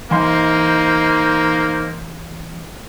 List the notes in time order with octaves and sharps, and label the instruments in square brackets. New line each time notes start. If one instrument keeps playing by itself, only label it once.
[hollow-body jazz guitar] E3 C6 [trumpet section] A#3 D#4 C5